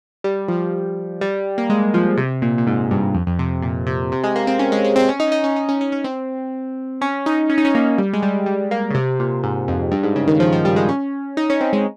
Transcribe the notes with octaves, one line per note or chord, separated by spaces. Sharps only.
G3
F3
G3
A#3
G#3
F3
C3
A#2
A#2
G#2
G2
F2
F2
C3
A#2
C3
C3
G#3
A#3
C4
C#4
G#3
G#3
C4
C#4
D#4
C#4
D#4
C#4
D#4
C#4
C#4
C#4
C4
C#4
D#4
C#4
D#4
C#4
A#3
G3
G#3
G3
G3
A#3
C#3
C3
A#2
G#2
F2
G2
G#2
C#3
D#3
F3
F3
G3
G#3
C#4
D#4
C#4
C4
G#3